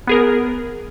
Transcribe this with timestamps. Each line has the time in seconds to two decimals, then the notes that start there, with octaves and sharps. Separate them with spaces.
0.07 B3 G#4 A#4